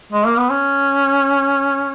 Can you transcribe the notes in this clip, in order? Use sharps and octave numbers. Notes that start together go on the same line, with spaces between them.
G#3
A#3
B3
C#4